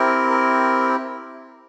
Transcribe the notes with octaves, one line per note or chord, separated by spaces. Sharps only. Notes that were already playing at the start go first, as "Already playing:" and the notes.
Already playing: C4 E4 G4 A#4
A#4